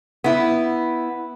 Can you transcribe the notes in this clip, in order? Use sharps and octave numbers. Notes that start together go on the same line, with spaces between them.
B3 E4